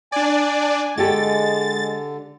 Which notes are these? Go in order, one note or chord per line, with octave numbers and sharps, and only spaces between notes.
D4 D5 G#5
D3 G#3 F#4 G4 A4 A6